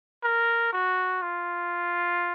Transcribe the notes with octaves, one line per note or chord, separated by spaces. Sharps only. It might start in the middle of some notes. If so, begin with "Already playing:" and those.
A#4
F#4
F4